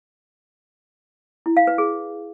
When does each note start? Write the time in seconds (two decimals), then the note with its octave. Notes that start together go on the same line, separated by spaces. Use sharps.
1.46 E4
1.57 F5
1.67 B4
1.78 G#4